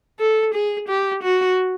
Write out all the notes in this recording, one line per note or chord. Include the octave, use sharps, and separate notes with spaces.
A4
G#4
G4
F#4